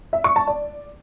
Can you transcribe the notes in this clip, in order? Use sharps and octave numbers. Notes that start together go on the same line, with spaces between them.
E5
C#6
A5
D5